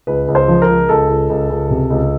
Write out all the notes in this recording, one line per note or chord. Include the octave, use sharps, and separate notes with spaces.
C#2 B4
C#2
C5
F3
A#4
C#2
C#2 A4
C#2
C#2
C#2
C3
C#2